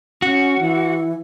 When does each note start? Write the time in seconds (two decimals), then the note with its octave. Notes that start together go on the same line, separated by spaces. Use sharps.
0.22 C#4 F#4
0.60 E3